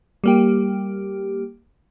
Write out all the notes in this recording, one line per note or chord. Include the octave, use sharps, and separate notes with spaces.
G3 A#3 G4